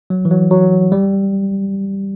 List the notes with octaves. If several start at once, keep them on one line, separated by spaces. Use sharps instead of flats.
F#3
E3
F#3
F#3
G3